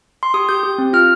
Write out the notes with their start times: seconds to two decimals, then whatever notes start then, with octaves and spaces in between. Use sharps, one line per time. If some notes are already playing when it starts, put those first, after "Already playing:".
0.23 C6
0.34 G4 D#6
0.49 G4 G6
0.64 G4
0.78 C4
0.93 F4 F6